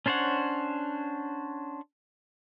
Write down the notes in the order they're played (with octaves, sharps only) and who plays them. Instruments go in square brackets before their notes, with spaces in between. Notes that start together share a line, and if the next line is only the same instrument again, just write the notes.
[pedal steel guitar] C#4 D4 C5 C#5 F#5